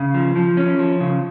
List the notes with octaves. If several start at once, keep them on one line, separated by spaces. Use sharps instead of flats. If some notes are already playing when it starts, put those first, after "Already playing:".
Already playing: C#3
F3
F3
C#4
F3
C#3